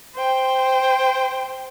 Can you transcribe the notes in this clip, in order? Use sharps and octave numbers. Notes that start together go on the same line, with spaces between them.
C5 G5